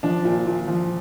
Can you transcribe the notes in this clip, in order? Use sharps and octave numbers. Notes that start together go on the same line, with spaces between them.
F3 D4
A#2
A#2
F3